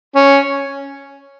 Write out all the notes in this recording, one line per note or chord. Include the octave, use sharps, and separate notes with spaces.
C#4